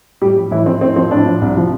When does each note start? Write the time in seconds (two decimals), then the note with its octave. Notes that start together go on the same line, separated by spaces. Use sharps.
0.21 A2 G3 G4
0.36 F3
0.51 A2 E3 E4
0.66 F3 C4
0.81 A2 C4
0.96 F3 C4
1.11 A2 D4
1.26 F3
1.41 C2
1.56 C3 F3